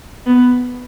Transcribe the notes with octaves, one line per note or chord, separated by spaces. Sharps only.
B3